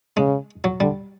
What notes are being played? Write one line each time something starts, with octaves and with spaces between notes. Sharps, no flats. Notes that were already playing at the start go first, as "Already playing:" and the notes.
C#3 G#3
F#3
D3 G3